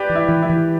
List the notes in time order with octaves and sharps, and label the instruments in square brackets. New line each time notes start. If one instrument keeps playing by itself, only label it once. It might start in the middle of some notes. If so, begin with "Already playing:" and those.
Already playing: [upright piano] G4 B4 D5
[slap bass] E3
[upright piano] E4
[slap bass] E3
[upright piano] E4
[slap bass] E3